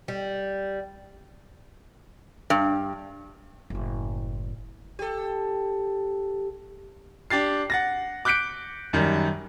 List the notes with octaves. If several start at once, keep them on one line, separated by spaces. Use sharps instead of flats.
G3
G2
F#1 A2
G4 A4
D4 G4 A6 C7
F#5 A6 A#6
D6 F#6 G6 B6 C#7 D7
F#2 D#3 G3